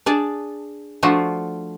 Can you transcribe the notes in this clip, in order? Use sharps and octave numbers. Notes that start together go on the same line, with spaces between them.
D4 G#4 D5 A5
F3 A3 D4 F4 F#4